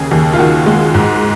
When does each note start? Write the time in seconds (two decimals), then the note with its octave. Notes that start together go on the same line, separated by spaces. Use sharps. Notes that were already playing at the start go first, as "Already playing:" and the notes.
Already playing: D#2 C#3 G#4
0.11 D#2
0.33 F4
0.39 D#3 F#4
0.66 G#3
0.94 G#2